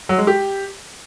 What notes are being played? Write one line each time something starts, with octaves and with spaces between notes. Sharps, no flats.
F#3
G#3
G4